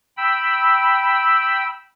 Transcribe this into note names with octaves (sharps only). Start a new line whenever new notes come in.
G5 B5 E6